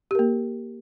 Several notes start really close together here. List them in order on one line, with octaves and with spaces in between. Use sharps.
G4 A#4 A#3